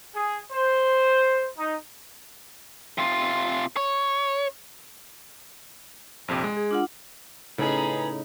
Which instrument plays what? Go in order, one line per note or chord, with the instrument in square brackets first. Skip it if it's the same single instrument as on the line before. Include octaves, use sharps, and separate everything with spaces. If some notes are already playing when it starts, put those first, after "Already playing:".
[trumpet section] G#4
C5
D#4
[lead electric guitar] C3 F4
C#5
[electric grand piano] A#1 F2 C3
G#3
[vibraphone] G#4
D4 F4 F#5
[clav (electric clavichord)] A2 [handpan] C#3 D#4 [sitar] B3 G#4 [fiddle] A#5 B5